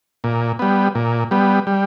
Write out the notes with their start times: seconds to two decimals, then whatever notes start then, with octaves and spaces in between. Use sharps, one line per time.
0.24 A#2
0.59 G3 B3
0.95 A#2
1.31 G3 B3
1.67 G3